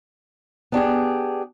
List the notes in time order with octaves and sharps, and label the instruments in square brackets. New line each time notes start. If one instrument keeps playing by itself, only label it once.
[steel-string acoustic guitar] B3 D4 G4 G#4